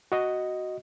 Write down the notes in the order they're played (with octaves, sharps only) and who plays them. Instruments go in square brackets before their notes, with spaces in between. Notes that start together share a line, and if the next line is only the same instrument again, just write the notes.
[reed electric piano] F#4 D#5